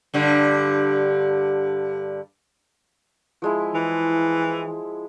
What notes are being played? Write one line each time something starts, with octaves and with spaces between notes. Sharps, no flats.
G2 D3 G3
F3 G#3 E4
E3